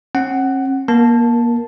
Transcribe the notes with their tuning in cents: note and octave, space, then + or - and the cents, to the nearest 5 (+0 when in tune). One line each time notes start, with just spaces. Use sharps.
C#4 -45 F#5 +15
A#3 +30 A#4 +0 A5 +0